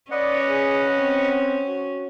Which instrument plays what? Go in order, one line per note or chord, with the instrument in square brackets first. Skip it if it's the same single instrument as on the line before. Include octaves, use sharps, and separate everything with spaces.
[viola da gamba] C#4 [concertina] B4 D#5 F#5 [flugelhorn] D5
[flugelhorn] G#4
C4
F#4